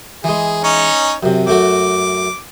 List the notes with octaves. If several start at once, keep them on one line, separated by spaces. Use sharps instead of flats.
E3 G#3 G#4
C#4 D#4 C#5
F#2 C3
F#2 A3 F#4 D6